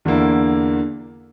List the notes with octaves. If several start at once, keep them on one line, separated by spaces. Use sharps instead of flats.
E2 D3 A#3 E4